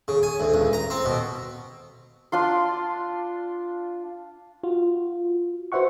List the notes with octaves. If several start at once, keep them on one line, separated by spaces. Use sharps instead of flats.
C#3
G#5
D2
C#2
A#5
C4
B2
D4 F4 C6
F4 F#4
F#4 B4 C5 E5 F#5 C#6